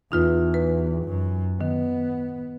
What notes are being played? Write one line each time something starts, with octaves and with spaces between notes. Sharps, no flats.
E2 D#4 F4 B4
B4
F#2
D#3 B3